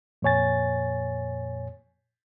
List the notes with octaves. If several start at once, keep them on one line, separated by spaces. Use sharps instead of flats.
F2 A#2 C#5 G#5 A6